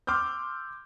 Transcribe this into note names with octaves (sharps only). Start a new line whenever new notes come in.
C6 D6 E6 F6 G6